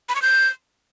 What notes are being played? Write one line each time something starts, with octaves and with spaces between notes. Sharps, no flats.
B5
C#6
G6